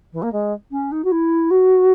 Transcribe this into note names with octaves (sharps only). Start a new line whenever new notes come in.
E3
A#3
G#3
C#4
D#4
F#4
E4
F#4